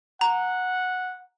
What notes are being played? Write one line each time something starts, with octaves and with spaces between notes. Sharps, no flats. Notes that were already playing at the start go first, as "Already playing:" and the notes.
F#5 A#5